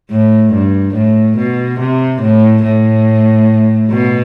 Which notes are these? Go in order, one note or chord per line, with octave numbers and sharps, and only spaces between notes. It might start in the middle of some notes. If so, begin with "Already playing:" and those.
A2
G2
A2
B2
C3
A2
A2
B2